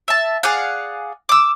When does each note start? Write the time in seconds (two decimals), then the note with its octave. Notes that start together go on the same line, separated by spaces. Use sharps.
0.08 E5 A5
0.43 G#4 D5 F5 F#5
1.29 D6 E6